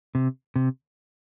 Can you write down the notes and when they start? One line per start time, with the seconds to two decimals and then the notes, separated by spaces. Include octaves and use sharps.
0.15 C3
0.56 C3